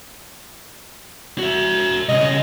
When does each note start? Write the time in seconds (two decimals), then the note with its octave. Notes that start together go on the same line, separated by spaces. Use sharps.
1.38 F#4 E5
2.09 C2 C#3 D#5